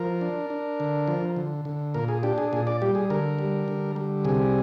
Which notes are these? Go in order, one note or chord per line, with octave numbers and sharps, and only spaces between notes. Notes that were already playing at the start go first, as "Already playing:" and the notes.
Already playing: F3 A#4
D4
D4
D3
F3
D3
D3
A#2 A#4
G#4
D4 G4
G#4
A#2 G#4
D5
G3 G4
G#4
D3 A#4
G3
D3
G3
C3 G#4